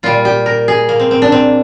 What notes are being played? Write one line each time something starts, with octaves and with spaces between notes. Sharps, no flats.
A#2 G3 F4
G4
A#4
G#4
A#3
C4
C4
D4
C4